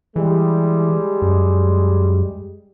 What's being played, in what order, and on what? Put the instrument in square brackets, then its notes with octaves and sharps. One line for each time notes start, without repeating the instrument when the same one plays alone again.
[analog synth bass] E3 [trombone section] G3 G#3
[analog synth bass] F#2